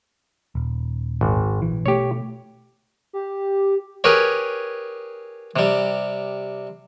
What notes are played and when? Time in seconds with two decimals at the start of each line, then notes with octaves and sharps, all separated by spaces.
0.55 D#1
1.21 G#1
1.62 A#1 E3
1.86 B2 A3 G4 C#5
3.13 G4
4.04 G4 G#4 A#4 B4 C#5
5.56 C3 G3